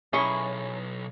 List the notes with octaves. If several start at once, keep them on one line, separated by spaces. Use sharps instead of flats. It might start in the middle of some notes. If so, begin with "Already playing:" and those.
B1 C#4 E4 G#4 C6 C#6